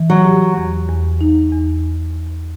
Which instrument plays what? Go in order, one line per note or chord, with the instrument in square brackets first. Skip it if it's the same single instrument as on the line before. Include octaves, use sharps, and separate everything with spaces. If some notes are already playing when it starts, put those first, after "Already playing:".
Already playing: [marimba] E3
[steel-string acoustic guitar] F#3
[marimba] G4
E2
E2
D#4
E2